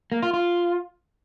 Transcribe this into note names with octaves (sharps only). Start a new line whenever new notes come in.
A#3
F4
F4